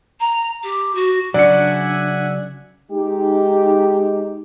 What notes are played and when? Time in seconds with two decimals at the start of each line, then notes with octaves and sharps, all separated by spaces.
0.20 A#5
0.63 G4
0.94 F#4
1.34 C#3 F#3 D4 D5 E5 F#5 G#5 C#7
2.91 G#3 D#4 G4